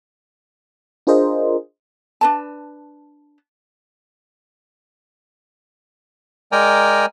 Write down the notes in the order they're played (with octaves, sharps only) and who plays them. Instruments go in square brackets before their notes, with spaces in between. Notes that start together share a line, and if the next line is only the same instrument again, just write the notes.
[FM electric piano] D4 F4 G#4 A#4 C5 D#5
[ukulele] D4 B4 A5
[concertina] G#3 A#4 D5 G5 G#5 A#5